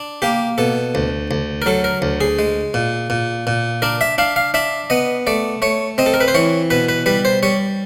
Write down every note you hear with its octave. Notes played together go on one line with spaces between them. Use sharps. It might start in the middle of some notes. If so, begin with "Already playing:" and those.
Already playing: D4
A#3 G4
B2 A4
D2
D2
A#4
F#3 A4
A#4
D2
G#4
G#3
A#2
A#2
A#2
D4 A#4
E5
D4 F5
F5
D4 E5
B3 D#5
A3 D5
A3 C#5
C4 D#5
A4
A#4
B4
C5
E3 C#5
B2 B4
B4
G3 B4
C5
G3 C#5